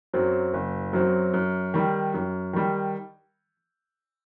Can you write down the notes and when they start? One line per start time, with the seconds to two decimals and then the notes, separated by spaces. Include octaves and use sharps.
0.13 F#2 F#3 C4
0.54 F#1
0.93 F#2 F#3 C4
1.34 F#2
1.74 D#3 G3
2.14 F#2
2.53 D#3 G3